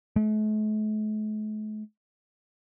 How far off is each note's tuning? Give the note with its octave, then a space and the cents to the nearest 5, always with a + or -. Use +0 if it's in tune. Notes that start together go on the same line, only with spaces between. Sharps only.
A3 -45